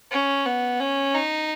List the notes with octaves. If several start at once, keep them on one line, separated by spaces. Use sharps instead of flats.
C#4
B3
C#4
D#4